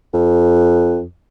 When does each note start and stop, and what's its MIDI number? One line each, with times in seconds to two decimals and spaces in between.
0.14 1.04 41